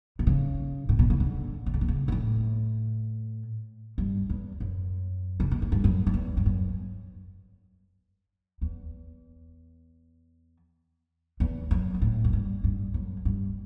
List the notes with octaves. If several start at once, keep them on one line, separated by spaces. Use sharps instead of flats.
B2
C#3
A2
B2
C#3
D3
D3
C#3
B2
C#3
G2
A2
G2
E2
F#2
C#3
B2
A2
G2
F#2
F#2
E2
G2
F#2
E2
E2
F#2
G2
A2
F#2
G2
G2
F#2
G2